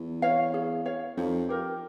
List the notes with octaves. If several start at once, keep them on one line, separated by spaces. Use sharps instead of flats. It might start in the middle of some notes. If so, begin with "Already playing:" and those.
Already playing: E2
C#5 F5
G#4
C#5 F5
F2 D#4
G4 A#4